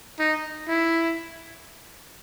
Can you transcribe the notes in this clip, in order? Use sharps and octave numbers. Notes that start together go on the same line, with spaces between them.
D#4
E4